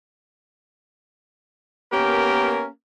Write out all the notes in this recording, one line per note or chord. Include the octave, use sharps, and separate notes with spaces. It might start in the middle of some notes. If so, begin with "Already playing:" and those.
A#3 B3 C#4 G4 A#4